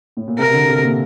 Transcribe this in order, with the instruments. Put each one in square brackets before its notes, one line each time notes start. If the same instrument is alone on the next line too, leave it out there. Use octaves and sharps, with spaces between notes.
[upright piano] A2
A#2
[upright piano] C3 [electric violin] A#4
[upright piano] D3
C3
A#2